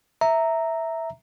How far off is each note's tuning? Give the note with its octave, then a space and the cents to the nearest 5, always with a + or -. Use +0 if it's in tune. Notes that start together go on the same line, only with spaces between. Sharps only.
E5 -5 A#5 -10